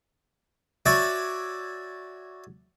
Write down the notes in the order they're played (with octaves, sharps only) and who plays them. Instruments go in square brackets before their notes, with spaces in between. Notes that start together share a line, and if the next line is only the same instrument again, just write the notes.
[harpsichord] F#4 C#5 D5 E5 G#5